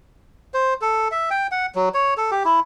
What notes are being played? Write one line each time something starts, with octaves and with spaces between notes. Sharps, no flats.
C5
A4
E5
G5
F#5
F#3
C#5
A4
G4
E4